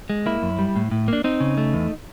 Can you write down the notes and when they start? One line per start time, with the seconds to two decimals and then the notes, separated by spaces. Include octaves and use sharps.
0.10 G#3
0.26 A#3 E4
0.43 F#2
0.59 G3
0.76 A2
0.91 A2
1.08 A#3 D4
1.24 C4 D#4
1.40 C#3
1.57 A3
1.74 E2